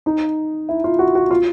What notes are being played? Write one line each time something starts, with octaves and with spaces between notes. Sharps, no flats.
D#4
E4
F4
F#4
F#4
F4